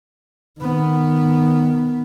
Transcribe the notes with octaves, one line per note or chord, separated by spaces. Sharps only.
D#3 B3